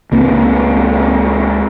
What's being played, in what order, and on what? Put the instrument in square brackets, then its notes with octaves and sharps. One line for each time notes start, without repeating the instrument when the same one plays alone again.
[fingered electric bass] C#2 A#3 C4